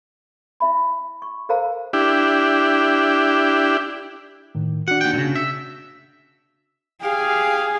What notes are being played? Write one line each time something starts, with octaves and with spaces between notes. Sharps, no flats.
E4 E5 B5
C#6
A4 A#4 C5 F5 A#5
D4 E4 G4
A2 D#3
D4 F#4 F#5
D#2 G5
A#2 C#3
E5
G4 G#4 F5